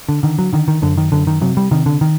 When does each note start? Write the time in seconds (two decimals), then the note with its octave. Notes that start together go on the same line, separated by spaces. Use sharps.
0.09 D3
0.23 D3 D#3
0.39 F#3
0.53 D3 D#3
0.68 D#3
0.82 F#2 D3
0.97 D#3
1.12 F#2 D3
1.27 D#3
1.41 C3 F#3
1.57 G3
1.71 C3 D#3
1.86 D3
2.01 D#3